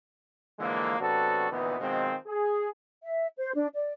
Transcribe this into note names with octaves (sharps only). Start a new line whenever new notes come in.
D3 E3 F3 G#3 A#3
C3 F#3 B3 D4 F#4 A4
D2 A#2 D#3 E3 B3
B2 D#3 F3 G#3 C4
G#4
E5
C5
D4
D5